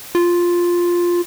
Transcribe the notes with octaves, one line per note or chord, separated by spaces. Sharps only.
F4